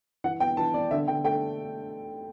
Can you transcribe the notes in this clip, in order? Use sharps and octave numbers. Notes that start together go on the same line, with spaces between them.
E3 F#5
B3 G5
E3 A5
B3 D5
D3 E5
D3 G5
A3 G5